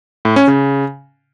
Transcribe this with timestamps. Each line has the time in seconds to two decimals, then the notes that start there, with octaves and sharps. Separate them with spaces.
0.25 A2
0.36 C#4
0.48 C#3